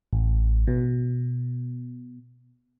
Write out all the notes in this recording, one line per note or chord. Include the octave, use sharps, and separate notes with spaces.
A1
B2